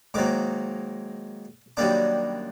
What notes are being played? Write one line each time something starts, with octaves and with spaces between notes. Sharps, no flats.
G#2 D#3 F#3 A#3 D6
F#2 D#3 G3 A#3 D4 D6